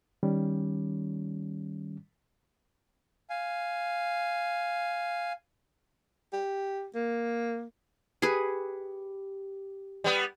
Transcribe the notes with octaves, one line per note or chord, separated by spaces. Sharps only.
D#3 G3 C#4
F5 G#5
G4
A#3
G4 G#4 B4
G3 B3